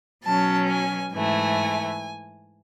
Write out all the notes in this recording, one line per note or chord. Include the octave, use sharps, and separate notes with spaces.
B2 F#3 C#4 A5
G#5
G#2 E3 A3 G#5